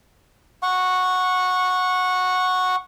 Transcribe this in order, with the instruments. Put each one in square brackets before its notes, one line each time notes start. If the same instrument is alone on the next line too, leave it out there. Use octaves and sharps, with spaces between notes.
[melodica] F#5 C#6